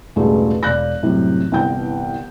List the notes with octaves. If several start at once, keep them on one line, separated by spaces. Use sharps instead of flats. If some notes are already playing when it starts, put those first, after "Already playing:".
A1 E2 G2 B2 G#3 A3
E1 D5 F5 F#6 G6 A#6
F#2 A2 C3 G3
G1 C2 E3 G5 G6